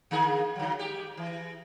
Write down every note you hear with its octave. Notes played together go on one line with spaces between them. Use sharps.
D3 A#3 G#4
D3 F#3
G#3 G4
E3